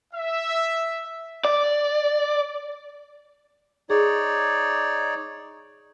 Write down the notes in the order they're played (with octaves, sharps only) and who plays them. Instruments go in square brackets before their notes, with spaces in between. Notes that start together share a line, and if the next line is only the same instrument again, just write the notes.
[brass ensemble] E5
[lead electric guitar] D5
[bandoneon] D#4 C#5 D5 [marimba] G#4